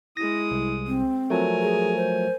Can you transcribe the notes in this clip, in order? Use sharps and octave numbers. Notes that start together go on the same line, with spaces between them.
G#3 E4 D#6 A#6
C2
C4
F3 F#3 A3 A#4 G#5
G#4
C5